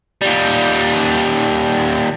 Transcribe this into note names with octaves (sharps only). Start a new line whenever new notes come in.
D#2 G3